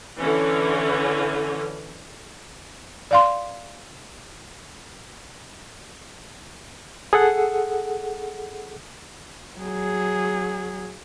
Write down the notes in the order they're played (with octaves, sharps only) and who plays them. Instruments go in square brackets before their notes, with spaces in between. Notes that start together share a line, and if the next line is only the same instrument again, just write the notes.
[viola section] D3 E3 C#4
[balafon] D5 F5 C6
[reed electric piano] G#4 A4 F#5
[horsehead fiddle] F#3 G#4